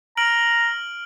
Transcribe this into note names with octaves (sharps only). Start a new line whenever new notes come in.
A#5 F6 D7 F#7